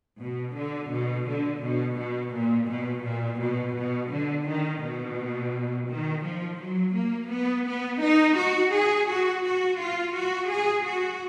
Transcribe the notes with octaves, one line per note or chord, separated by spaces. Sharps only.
B2
D3
B2
D3
B2
B2
A#2
B2
A#2
B2
B2
D3
D#3
B2
D#3
F3
F#3
A#3
B3
B3
D#4
F#4
G#4
F#4
F#4
F4
F#4
G#4
F#4